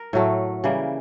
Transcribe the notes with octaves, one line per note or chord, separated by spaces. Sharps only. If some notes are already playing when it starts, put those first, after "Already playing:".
Already playing: A#4
A2 F#3 A3
C#3 E3 G3 A#3